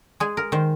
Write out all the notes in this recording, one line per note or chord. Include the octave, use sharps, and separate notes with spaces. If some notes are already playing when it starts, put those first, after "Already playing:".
G#3 G#4
A#4
D#3 C5